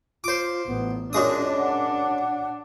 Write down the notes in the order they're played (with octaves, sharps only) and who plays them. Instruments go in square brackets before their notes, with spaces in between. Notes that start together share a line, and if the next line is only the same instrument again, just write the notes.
[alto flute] F4 [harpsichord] C5 D6
[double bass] A1 [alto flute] B3
[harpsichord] F#2 G#3 D#6 [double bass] D4 [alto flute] F4
[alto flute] F#5